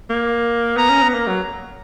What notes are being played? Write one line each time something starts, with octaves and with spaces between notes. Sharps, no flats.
A#3
B3 A#5
C#4
B3
A#3
F#3